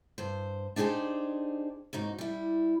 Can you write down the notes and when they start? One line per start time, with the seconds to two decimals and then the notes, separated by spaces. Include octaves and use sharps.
0.18 G2 C5
0.76 D4 D#4 G4 G#4 C5
1.93 D#2 G#2 D#4 F#4
2.18 G3 E4